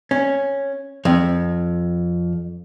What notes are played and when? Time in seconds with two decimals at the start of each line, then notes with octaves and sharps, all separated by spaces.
0.11 C#4
1.05 F2